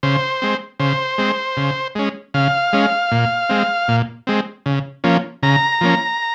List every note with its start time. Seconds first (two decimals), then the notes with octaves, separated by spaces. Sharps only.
0.03 C#3 C5
0.42 G#3 C4
0.80 C#3 C5
1.18 G#3 C4
1.57 C#3
1.95 G#3 C#4
2.34 C#3 F5
2.73 G#3 C#4
3.12 A#2
3.49 G#3 C4
3.88 A#2
4.27 G#3 C4
4.66 C#3
5.04 F3 A#3 C#4
5.43 C#3 A#5
5.81 F3 A#3 C#4